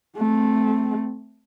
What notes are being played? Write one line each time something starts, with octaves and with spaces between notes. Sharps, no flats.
A3 C4